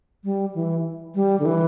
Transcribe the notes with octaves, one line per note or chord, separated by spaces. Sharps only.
G3
E3
G3
D3
E3